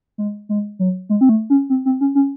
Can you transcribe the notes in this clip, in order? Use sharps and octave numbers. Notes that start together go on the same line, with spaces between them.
G#3
G#3
F#3
G#3
C4
A3
C#4
C4
C4
C#4
C#4